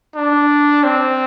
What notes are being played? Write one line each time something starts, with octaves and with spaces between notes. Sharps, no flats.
D4
C4